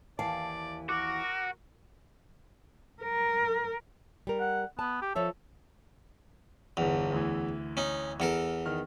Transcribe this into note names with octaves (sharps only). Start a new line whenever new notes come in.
D#2 E3 D5 F5 A5
F#4 A#4 D6
A#4
G3 A#4
F#5
B3 A5
G4
F3 A4 C#5 E5
G1 E2 F7
D2 E3
C#4 D#4
E2 A4 A#4
D#3 F6